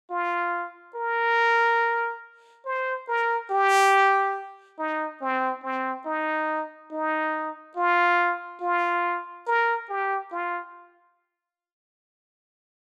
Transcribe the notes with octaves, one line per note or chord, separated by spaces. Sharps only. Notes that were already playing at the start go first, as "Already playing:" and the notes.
F4
A#4
C5
A#4
G4
D#4
C4
C4
D#4
D#4
F4
F4
A#4
G4
F4